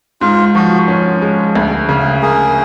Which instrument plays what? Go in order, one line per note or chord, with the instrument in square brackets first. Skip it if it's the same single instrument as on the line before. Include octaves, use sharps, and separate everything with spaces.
[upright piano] G#2 [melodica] F4
[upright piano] F3 [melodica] F#4
[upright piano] C#4
G#3
D2
C#3
[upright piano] A#3 [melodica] G#4